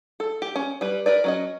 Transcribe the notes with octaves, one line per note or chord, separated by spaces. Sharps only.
A4
G4
C#4
G3 B4
A#4 B4 D5
F#3 C#4 D#5